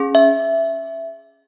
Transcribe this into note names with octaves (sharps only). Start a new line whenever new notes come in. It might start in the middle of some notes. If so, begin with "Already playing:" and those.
Already playing: C#4 G#4
E5